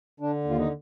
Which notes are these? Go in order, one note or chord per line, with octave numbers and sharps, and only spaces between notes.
D3 D4
D#2
F4
D#4